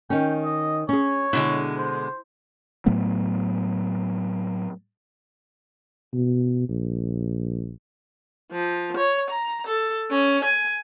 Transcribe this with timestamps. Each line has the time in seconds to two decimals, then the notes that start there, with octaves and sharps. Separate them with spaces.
0.10 D#3 C#4 G5
0.45 D#5
0.89 C#4 G#4 C#5
1.33 B2 D3 G#3 E4
1.77 C5
2.86 A2 F#3 A3 B3
6.13 B2
6.69 A#1
8.51 F3
8.97 C#5
9.30 A#5
9.67 A4
10.11 C#4
10.44 G#5